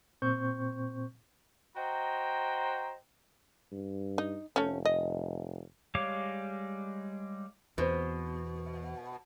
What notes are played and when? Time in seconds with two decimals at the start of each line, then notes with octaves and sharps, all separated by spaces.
0.22 A#2 C4 C5 C#6 G6
1.77 F#4 C5 D#5 G5 A#5
3.72 G2
4.18 D#4
4.56 F1 A3 C#4
4.85 D#5
5.95 G3 G#3 C#5 F5 D6
7.78 E2 B2 B3 C4 C5